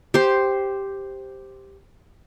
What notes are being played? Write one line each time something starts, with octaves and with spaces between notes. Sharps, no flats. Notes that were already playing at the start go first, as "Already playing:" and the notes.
G4 C5